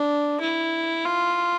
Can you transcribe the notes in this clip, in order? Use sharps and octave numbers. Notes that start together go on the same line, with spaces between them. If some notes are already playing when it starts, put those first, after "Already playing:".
Already playing: D4
E4
F4